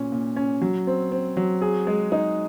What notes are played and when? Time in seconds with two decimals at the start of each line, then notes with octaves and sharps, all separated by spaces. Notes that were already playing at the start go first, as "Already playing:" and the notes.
Already playing: A#2 C#4
0.12 A#2
0.36 C#4
0.61 F#3
0.87 C4
1.12 C4
1.37 F#3
1.62 G#4
1.87 G#3
2.12 D#4